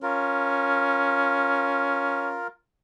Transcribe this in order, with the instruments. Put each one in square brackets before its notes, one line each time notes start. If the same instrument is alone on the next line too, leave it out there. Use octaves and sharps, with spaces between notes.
[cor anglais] C#4 [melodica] F4 A#4